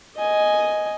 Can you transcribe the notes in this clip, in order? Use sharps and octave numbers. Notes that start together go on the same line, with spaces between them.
D#5 G#5